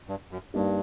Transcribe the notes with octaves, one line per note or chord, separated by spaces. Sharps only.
G2
F#2
G2 G3 A#3 D#4